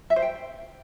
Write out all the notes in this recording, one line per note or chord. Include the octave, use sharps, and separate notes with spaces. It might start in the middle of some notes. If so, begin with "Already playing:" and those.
E5
C5
G5